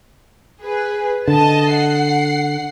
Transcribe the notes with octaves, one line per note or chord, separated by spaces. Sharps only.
G#4 B4
D3 D#5 A5
F#5 C7